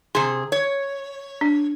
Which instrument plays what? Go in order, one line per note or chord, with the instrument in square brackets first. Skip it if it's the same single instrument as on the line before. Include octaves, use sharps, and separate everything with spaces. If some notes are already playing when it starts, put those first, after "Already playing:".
[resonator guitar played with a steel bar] C3 G#4 [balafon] C6
[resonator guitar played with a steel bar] C#5
[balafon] D4